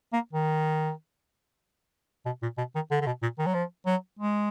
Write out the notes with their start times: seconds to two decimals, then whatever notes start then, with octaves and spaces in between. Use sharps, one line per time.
0.13 A#3
0.33 D#3
2.25 B2
2.42 A#2
2.58 B2
2.75 D#3
2.91 D3
3.01 D3
3.06 B2
3.22 A#2
3.38 D#3
3.46 F#3
3.54 F3
3.86 F#3
4.19 G#3